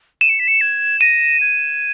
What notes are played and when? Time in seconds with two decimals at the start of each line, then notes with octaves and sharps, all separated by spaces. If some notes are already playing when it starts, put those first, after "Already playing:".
0.21 D#7 E7
0.29 C#7
0.39 B6
0.48 C#7
0.61 G#6
1.01 A#6 D#7
1.42 G#6